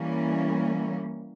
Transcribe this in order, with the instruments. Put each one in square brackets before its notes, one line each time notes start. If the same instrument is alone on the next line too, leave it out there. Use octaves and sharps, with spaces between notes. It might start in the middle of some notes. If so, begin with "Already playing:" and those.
Already playing: [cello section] E3 G3 A#3 C#4